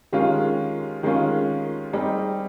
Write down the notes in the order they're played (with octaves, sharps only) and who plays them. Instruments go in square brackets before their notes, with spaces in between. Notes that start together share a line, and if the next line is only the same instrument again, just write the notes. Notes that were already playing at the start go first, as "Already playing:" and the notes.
[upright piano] D#3 G#3 C#4 F4 [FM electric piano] G4
[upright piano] D#3 G#3 C#4 F4
[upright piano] G3 C4 D#4 G#4 [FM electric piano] G4